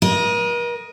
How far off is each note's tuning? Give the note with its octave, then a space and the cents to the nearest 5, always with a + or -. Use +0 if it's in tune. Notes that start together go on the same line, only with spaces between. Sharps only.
A#4 +45 D#5 +0